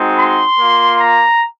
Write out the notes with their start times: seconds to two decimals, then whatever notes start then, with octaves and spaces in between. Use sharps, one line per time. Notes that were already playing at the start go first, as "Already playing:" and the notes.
Already playing: G#3 C4 D#4 F#4
0.19 C6
0.60 A#3 F4
1.01 A#5